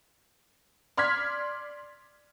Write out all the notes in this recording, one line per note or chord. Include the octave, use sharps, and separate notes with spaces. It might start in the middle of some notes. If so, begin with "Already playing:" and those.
D5 C6 F6 G#6 B6